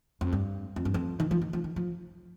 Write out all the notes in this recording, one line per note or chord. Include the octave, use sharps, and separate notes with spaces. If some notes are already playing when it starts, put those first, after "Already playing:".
F2
G2
F2
G2
F2
D#3
F3
D#3
F3
D#3
F3